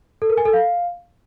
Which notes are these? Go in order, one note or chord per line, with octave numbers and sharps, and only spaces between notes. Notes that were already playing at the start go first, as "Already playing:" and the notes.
A4
A#4
G#5
A4
F5